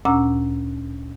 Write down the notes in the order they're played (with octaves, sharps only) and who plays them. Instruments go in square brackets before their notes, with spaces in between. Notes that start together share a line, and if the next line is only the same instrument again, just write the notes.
[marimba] D2 A#2 C#4 A#5 E6